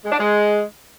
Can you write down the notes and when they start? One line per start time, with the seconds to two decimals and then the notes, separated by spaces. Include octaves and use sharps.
0.04 G#3
0.12 D4
0.19 G#3